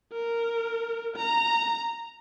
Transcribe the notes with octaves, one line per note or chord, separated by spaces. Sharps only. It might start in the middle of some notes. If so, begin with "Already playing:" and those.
A#4
A#5